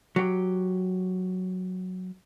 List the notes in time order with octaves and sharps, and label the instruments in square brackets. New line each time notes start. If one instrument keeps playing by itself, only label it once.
[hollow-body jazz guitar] F#3 G4